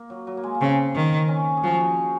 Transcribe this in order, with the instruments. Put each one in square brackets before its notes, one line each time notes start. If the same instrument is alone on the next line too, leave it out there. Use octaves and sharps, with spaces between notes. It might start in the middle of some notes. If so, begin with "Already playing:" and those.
Already playing: [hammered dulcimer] A#3
F#3
F#3
A#3
G#3
A#3
[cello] C#3 [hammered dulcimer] C4
[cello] D#3
[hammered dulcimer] C#4
G#4
[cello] F3 [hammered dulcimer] F#4
[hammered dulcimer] D#4